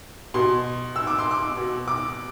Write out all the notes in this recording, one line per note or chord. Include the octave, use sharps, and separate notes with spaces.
B2 C6
E6
D6
C6
D6
B2
D6